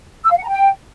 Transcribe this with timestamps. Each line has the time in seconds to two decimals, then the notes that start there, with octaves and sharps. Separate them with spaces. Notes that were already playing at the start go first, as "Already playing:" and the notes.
0.25 E6
0.31 F5
0.37 F#5
0.43 A#5
0.49 G5